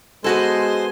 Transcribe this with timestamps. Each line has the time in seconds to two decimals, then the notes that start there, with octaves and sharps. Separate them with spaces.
0.24 G#3 B3 F#4 A4 C5 G#5 C6